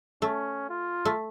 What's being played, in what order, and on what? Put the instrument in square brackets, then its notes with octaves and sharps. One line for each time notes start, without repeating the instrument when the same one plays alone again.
[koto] A3 [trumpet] C#4
[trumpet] F4
[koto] A3